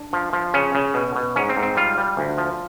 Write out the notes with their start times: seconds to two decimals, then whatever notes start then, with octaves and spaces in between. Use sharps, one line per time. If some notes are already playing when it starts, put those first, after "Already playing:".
Already playing: D4
0.13 F3
0.33 F3
0.54 C#3 C#4
0.75 C#3
0.94 B2
1.16 B2
1.36 G#2 C#4
1.49 C4
1.57 G#2
1.63 C4
1.77 G3 F4
1.98 G3
2.17 D2
2.38 F3